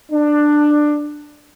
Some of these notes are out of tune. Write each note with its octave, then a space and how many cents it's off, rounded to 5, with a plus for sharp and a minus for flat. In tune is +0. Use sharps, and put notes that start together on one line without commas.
D4 +15